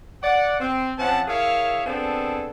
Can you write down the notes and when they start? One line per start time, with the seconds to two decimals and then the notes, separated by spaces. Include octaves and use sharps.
0.23 D5 F#5
0.60 C4
0.98 F3 C4 C#4 E5 F#5 A5
1.28 E4 G#4 A#4 C#5 E5 F5
1.86 B3 C4 D4 G#4 A4